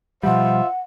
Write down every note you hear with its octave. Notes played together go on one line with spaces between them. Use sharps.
B2 F3 G3 F4 C5 E5 F#5